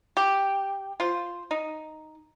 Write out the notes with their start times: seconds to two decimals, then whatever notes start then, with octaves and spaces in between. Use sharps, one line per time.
0.17 G4
1.00 F4 C5
1.51 D#4